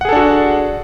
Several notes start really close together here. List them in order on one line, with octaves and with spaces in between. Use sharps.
F#5 G#4 A4 D4 F#4